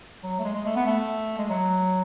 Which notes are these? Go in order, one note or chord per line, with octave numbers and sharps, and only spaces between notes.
F#3
A3
G#3
G#3
A3
B3
A3
G#3
F#3